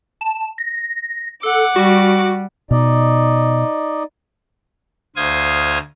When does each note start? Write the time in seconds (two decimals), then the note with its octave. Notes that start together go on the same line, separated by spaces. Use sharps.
0.21 A5
0.58 A#6
1.43 A4 F#5 D6
1.76 G3 F#4
2.71 B2 D#4 D5 D#5
5.16 D2 C5 F5 D#6 G#6